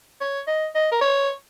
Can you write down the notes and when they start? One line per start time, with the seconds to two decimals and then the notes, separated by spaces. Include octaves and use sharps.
0.21 C#5
0.47 D#5
0.75 D#5
0.91 A#4
1.01 C#5